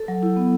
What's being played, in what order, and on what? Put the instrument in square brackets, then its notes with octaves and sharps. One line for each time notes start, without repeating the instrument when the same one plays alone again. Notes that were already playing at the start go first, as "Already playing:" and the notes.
Already playing: [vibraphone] A4
F#3
E4
B3